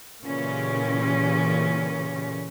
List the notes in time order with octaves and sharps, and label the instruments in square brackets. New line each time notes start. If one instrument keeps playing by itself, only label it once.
[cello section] A#2 C#3 E3 C#4 G4